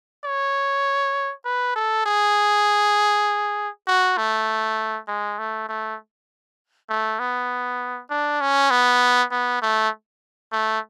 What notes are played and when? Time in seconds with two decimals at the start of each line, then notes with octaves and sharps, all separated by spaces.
0.24 C#5
1.45 B4
1.75 A4
2.06 G#4
3.87 F#4
4.17 A3
5.08 G#3
5.38 A3
5.69 A3
6.89 A3
7.19 B3
8.10 D4
8.40 C#4
8.70 B3
9.31 B3
9.62 A3
10.52 A3